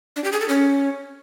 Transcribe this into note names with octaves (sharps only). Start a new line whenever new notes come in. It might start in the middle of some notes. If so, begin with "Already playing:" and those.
D4
G4
G#4
A4
C#4